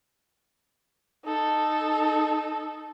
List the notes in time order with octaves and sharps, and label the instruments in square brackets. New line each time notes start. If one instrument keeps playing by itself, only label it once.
[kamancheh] D#4 A4